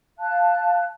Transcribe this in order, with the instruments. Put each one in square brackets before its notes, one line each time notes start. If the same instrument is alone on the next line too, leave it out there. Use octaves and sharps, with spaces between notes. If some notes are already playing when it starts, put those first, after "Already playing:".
[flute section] F5 A5 F#6